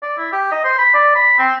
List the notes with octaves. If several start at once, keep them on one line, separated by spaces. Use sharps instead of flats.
D5
E4
G4
D#5
C5
B5
D5
B5
C4